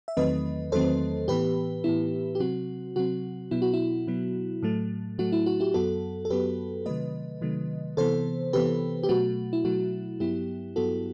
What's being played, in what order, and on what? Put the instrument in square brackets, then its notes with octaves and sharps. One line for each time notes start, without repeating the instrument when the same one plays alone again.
[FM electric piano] E5
E2 D#3 F#3 A3 C4 B4 D#5
E2 D#3 F#3 A3 C4 A4 C5
A2 E3 B3 G4 B4
A2 E3 B3 E4
G4
C3 F#3 C4 F#4
C3 F#3 C4 F#4
B2 F#3 B3 E4
F#4
E4
B2 F#3 B3
A2 F#3 A3
A2 F#3 A3 F#4
E4
F#4
E4 G4
F#2 F#3 B3 F#4 A4
A4
F#2 F#3 B3 G4 B4
C3 D#3 F#3 A3 B4 D#5
C3 D#3 F#3 A3
C3 E3 B3 A4 C5
C3 E3 B3 G4 B4
G4
B2 F#3 A3 F#4
E4
B2 F#3 A3 F#4
G2 F#3 B3 E4 G4
G2 F#3 B3 F#4 A4